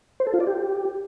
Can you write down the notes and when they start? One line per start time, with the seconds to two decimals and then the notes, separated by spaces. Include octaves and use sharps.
0.20 C5
0.27 A4
0.34 F4
0.40 D5
0.47 G4